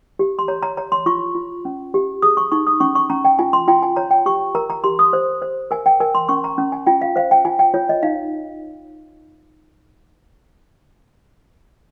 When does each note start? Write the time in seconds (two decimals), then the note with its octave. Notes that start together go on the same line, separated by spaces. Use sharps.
0.19 G4
0.39 C6
0.48 C#5 A#5
0.63 A#5
0.77 C#5 A#5
0.92 C6
1.06 F4 C#6
1.35 F4
1.65 C#4
1.94 G4
2.22 G#4 D#6
2.37 C#6
2.52 D#4 C#6
2.67 D#6
2.80 C#4 C#6
2.95 C#6
3.10 C#4 A#5
3.25 G5
3.39 F4 G#5
3.53 C6
3.68 F4 G5
3.83 G#5
3.96 C#5 A#5
4.11 G5
4.26 G4 C#6
4.55 A#4 A#5
4.70 A#5
4.84 G4 C6
4.99 D#6
5.13 C5
5.42 C5
5.71 A#4 G#5
5.86 G5
6.00 A#4 G#5
6.15 C6
6.29 C#4 C#6
6.44 A#5
6.58 C#4
6.72 G#5
6.86 F4 G5
7.02 F5
7.16 C5 F5
7.31 G5
7.45 F4 G#5
7.59 G5
7.74 F4 C#5
7.89 D#5
8.03 D#4 F5